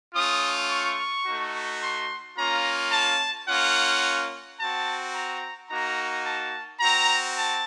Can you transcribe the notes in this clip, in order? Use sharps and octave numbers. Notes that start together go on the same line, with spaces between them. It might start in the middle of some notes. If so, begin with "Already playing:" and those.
A3 C#4 F4 D#6
C#6
A3 D#4 F#4
C6
A#3 C#4 F4 A#5
A5
A#3 C#4 F4 F#5
C4 F#4 A5
A#5
A#3 D#4 F#4 A#5
A5
C4 F#4 A#5
A5